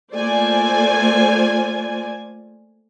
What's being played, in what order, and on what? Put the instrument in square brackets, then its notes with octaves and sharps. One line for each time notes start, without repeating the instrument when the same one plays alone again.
[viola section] A3 A#3 F4 C5 D5 G#5